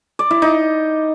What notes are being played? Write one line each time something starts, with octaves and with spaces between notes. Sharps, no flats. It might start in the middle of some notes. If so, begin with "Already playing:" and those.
D5
E4
D#4